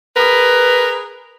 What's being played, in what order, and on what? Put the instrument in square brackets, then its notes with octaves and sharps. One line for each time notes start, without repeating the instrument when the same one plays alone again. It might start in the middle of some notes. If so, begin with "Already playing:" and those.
[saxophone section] G#4 A#4 B4